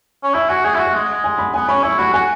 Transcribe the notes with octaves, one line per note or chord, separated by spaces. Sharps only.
C#4
E4 E5
F#4 G#5
G#4 F#5
E4 F#4 E5
F#5
G#3
G#3
G#5
B5
B3 G#5
C#4 B5
E4 C#6
F#4 B5
F#4 G#5